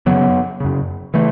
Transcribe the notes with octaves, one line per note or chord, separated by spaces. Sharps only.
F#2 C#3 F#3 B3
F#2 C#3
C#3 E3 A3